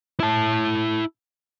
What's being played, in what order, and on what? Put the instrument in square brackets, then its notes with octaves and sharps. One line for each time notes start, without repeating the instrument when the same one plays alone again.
[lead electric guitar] E4 A5